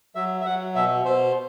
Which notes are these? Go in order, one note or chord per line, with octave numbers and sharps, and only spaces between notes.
F#3 E5
E5
F#3 F#5
B2 E5
B2 C5